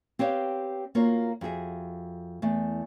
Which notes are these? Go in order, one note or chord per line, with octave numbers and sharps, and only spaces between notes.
C4 G4 B4 C#5 F5
A#3 F4 F#4 A#4 C#5
F2 F#4 G#4 E5
E2 A3